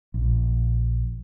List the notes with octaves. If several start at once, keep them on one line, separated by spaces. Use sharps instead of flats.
A#1